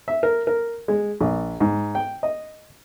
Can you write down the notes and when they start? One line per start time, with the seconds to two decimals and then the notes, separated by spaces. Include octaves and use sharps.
0.08 E5
0.23 A#4
0.47 A#4
0.88 G#3
1.20 A#1
1.60 G#2
1.95 G5
2.23 D#5